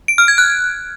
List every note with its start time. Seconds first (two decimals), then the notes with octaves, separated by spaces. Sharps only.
0.08 D7
0.18 F6
0.28 G#6
0.38 F#6